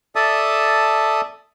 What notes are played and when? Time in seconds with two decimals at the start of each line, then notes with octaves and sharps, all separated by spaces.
0.15 A4 D5 E5 A5 D#6